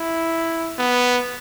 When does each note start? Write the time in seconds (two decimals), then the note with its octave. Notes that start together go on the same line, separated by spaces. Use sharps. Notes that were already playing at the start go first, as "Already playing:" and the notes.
Already playing: E4
0.79 B3